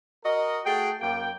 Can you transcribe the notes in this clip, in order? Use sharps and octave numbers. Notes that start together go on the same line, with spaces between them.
F#4 A#4 D#5
A3 F#4 G#4 G5
F#2 A#3 G5